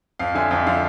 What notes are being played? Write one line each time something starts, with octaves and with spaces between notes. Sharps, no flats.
F2 F5
D3 F3 E5 G#5
F2 E5
D3 F3 F5